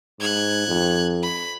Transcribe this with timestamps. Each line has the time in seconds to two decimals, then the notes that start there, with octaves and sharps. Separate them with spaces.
0.20 G#2 F#6 G#6
0.68 F2
1.22 B5